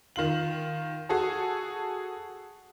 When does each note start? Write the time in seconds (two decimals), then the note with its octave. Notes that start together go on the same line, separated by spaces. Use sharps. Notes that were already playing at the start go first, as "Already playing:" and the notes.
0.16 D#3 F4 F#7
1.09 F#4 G#4 A4